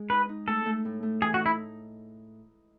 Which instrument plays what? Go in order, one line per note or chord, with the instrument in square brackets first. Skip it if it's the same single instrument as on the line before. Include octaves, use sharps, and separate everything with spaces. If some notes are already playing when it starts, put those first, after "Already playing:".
Already playing: [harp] G#3 G#4
[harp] D#4 [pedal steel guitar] B4
[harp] D#4
[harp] A3 [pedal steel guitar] A4
[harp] A3
A2
A3
[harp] E3 [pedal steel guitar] G#4
[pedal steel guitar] F#4
[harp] D#4
[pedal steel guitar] E4